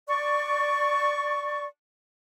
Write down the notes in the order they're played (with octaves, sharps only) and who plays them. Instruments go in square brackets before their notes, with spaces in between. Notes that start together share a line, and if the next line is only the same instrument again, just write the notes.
[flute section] D5 C#6